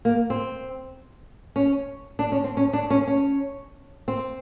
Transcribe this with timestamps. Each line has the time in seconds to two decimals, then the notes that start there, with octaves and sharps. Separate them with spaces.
0.05 A#3
0.30 C4
1.56 C#4
2.19 D4
2.32 C#4
2.44 C4
2.57 C#4
2.73 D4
2.90 C#4
3.08 C#4
4.08 C4